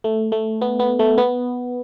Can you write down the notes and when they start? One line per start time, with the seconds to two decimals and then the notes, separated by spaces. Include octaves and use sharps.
0.04 A3
0.32 A3
0.61 B3
0.80 B3
0.99 A3
1.18 B3